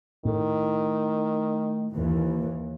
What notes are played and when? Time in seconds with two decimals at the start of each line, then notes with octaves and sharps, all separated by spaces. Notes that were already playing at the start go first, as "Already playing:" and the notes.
0.25 A2 D#3
1.91 D#2 E3